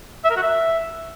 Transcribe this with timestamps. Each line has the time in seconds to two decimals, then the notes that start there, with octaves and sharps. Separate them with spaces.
0.24 E5
0.30 A#4
0.36 F#4
0.42 E5